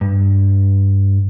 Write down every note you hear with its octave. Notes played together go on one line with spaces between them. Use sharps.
G2